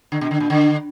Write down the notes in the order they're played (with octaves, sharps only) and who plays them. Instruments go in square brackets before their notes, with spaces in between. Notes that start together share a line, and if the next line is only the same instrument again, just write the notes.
[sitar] D3
B2
D3
A#2
D3